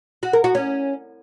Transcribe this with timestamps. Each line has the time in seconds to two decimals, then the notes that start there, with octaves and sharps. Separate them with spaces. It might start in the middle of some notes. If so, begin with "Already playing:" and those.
0.23 F#4
0.33 A#4
0.44 F#4
0.55 C#4